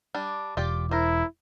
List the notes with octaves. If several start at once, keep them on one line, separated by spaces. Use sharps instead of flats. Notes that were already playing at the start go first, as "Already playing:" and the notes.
G3 D4
E1 F4 G4 D5
E4 A#4 C5